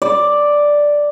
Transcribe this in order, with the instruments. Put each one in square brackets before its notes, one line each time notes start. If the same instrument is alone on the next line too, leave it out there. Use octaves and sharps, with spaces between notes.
[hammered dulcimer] D5